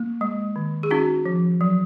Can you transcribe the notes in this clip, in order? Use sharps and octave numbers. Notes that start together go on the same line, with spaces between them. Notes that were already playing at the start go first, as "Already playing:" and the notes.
Already playing: A#3
G#3
D#3
G#4
C#4 D#4 F#4
F3
F#3